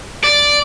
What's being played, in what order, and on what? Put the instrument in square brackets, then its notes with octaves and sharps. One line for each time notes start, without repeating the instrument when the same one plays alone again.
[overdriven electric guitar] D5